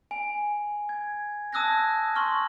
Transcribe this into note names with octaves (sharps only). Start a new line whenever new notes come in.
G#5
G#6
A5 D#6 E6 F#6 G#6 A#6
C6 C#6 F6